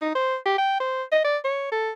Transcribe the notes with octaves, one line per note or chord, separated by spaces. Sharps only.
D#4
C5
G4
G5
C5
D#5
D5
C#5
A4